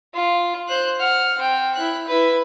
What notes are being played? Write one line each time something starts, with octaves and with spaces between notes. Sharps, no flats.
F4
C5 F#6
F#5 F6
C4 G5
E4 F#6
E4 B4